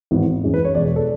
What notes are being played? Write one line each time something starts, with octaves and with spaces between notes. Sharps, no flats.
G#1 G#2 E3 B3
F#2 E3 G#3 C#4
B4
C#5
E2 B2 G#3 D5
A4